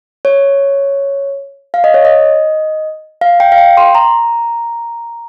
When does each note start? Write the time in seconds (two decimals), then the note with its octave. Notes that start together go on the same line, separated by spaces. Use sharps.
0.25 C#5
1.74 F5
1.84 D#5
1.94 C#5
2.05 D#5
3.21 F5
3.40 G5
3.52 F5
3.58 G5
3.77 C6
3.95 A#5